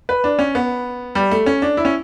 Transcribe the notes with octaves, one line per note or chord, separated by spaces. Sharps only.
B4
D4
C#4
B3
G3
A3
C#4
D4
E4
C#4